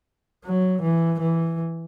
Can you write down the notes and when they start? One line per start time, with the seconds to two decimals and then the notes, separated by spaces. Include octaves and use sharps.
0.45 F#3
0.81 E3
1.20 E3